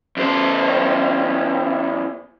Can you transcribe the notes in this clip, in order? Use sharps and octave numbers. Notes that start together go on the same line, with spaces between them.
E2 C5